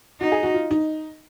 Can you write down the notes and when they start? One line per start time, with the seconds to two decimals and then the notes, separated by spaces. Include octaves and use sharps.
0.21 D#4 F#4
0.32 G#4
0.43 F#4
0.54 F4
0.71 D#4